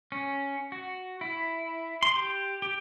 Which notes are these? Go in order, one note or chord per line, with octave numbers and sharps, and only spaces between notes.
C#4
F#4
E4
C6
G4
G4